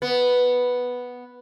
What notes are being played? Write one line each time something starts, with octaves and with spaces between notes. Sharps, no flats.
B3